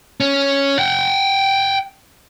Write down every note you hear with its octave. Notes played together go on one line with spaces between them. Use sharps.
C#4
F#5 G5